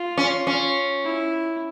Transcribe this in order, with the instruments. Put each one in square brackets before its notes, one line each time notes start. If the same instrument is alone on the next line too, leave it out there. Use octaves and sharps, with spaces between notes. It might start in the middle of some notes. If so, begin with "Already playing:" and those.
Already playing: [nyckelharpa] F4
[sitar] C#4
C#4
[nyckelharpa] E4